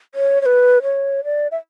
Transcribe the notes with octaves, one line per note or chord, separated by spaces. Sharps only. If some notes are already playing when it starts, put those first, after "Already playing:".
C#5
C#5
B4
C#5
D5
E5